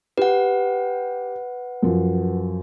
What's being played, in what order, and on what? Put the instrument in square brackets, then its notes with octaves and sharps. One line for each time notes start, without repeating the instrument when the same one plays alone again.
[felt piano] G4 [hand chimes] B4 F#5
[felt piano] F#2 F3